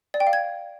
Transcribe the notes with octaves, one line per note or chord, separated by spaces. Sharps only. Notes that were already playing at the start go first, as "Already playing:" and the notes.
D5
G5
F5
G#6